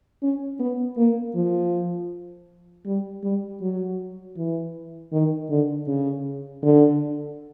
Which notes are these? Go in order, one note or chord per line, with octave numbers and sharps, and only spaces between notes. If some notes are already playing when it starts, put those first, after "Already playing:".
C#4
B3
A#3
F3
G3
G3
F#3
E3
D#3
D3
C#3
D3